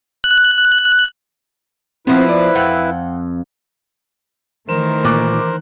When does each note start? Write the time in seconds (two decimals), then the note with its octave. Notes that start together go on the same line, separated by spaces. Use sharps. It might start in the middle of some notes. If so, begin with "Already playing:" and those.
0.24 F#6
2.07 F3 B3 C4 E4 B4
2.29 D5
2.55 F2 F#5 G5
4.69 D#3 E3 A3 A#4 C5 E7
5.05 A#2 C#6 D6 F#6